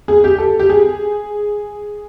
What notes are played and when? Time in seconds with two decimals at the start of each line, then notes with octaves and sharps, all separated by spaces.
0.08 G#4
0.24 G4
0.38 A4
0.59 G4
0.70 G#4